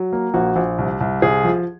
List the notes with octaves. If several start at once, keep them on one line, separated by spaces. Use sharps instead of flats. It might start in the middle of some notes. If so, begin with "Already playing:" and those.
Already playing: F#3
A#3
A#1 F#4
A#1
C2
C2
C2 G#4
F3